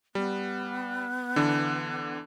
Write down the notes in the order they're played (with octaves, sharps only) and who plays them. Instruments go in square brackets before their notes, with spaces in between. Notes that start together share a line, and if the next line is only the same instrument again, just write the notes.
[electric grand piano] G3 [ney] B3
[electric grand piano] D3 E3 D4